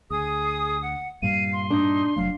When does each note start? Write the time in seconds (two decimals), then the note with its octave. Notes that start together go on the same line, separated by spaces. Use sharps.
0.10 D2 G#4 D#6
0.82 F#5
1.22 G2 A#2 G3 F5 D#7
1.53 C6
1.70 D4 D#4
2.16 F1 F#3 A3 F5